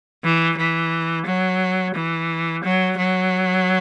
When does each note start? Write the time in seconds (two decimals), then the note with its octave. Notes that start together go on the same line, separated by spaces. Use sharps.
0.24 E3
0.57 E3
1.26 F#3
1.94 E3
2.64 F#3
2.98 F#3